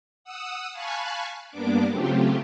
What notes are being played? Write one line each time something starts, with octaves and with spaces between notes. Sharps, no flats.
F#5 D#6 E6
F5 G#5 A5 B5 C#6 F#6
G2 A#3 B3 D4 D6
C#3 F#3 A3 C4 F4 G4